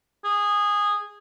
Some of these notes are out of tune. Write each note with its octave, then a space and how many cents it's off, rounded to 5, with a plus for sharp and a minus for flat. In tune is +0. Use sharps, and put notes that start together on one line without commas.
G#4 -15